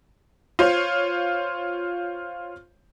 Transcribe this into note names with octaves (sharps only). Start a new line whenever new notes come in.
F4 C5 C#5